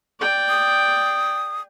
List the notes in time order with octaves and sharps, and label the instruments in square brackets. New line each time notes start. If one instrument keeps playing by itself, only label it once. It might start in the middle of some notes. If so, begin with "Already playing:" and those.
[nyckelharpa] D5 G5
[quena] D#6